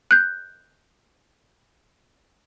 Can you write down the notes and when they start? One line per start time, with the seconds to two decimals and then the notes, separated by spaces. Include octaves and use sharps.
0.11 F#6 G6